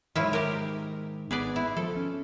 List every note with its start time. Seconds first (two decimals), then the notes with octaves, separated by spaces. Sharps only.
0.15 G#2 D#3 F#3 E4 F4
0.33 G4 A#4
1.31 G#1 B3 G#4 B4 D5
1.56 E4
1.77 F3 A4
1.96 C#4